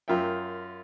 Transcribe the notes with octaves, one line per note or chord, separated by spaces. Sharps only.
F#2 F4 A#4 E5 G5